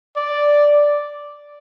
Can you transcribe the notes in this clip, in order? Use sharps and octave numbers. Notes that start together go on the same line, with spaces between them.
D5